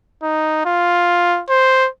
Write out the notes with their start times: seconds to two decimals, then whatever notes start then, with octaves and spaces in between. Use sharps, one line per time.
0.23 D#4
0.65 F4
1.49 C5